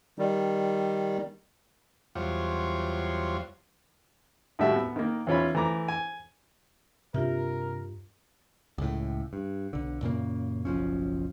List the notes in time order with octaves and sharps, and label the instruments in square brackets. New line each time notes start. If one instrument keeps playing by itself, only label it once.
[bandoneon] D#3 G3
[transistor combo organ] E2 F#3 G3 F4 C5 C#5
[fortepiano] D#2 A2 G3 F#4 E5 E6
B3
D#3 A#3
E2 D#3 C#4 F4 C#5 B5
E3 A3 A#5 D6
G#5
[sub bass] G2 [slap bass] C3 D4 [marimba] F4 G4 E5 [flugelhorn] A#4
[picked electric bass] C#2 A2
G2
B1 D3
F#2 A#2 C#3 A#3
F#1 B1 F3 C#4